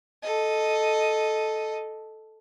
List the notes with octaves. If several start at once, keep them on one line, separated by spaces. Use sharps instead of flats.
A4 D#5